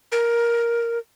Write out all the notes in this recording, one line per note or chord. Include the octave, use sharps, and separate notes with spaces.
A#4